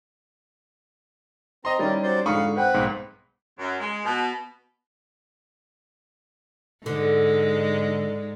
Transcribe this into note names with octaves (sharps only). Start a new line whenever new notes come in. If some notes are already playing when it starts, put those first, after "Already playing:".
C4 D#5 A#5 C6
D#3 G3 C#4 D#4 E4 D5
F#3 C5 D5
F2 G#2 D3 F5 B5 C#6 D#6 C#7
C4 B4 F#5 G5
B1 G#2
F#2
G#3
B2
G#2 D3 G#3